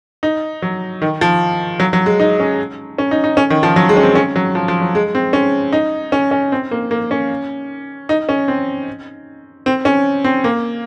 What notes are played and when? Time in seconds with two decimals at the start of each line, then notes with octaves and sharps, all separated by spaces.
0.23 D#4
0.62 F#3
1.02 D#3
1.21 F3
1.80 F#3
1.93 F#3
2.06 G#3
2.20 D#4
2.40 C#4
2.98 C#4
3.11 D#4
3.24 D#4
3.37 C#4
3.50 D#3
3.63 F3
3.76 F#3
3.89 G#3
3.97 C#4
4.03 C4
4.15 C#4
4.36 F#3
4.55 F3
4.68 F3
4.82 F#3
4.95 G#3
5.15 C4
5.33 C#4
5.73 D#4
6.12 C#4
6.31 C#4
6.52 C4
6.71 A#3
6.91 A#3
7.11 C#4
8.09 D#4
8.29 C#4
8.48 C4
9.66 C4
9.85 C#4
10.24 C4
10.44 A#3